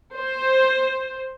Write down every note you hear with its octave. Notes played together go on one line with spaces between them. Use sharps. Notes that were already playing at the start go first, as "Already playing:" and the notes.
C5